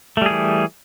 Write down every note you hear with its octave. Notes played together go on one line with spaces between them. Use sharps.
E3 G3 A3 G#4